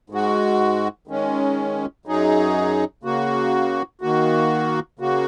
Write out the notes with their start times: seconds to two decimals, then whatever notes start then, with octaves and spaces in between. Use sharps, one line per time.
0.10 G#2 G#3 F#4
1.08 D#3 G#3 C#4
2.06 F#2 F#3 D#4 G#4
3.03 C#3 A#3 F#4
4.01 D#3 A#3 F#4
4.99 C#3 A#3 F#4